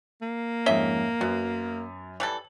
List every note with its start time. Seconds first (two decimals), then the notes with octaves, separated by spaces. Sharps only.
0.22 A#3
0.66 F2 G#2 C#4 D#5 E5 G7
1.21 F#2 B3
2.20 E3 G3 A4 F#7